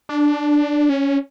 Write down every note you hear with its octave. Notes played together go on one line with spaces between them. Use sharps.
D4
C#4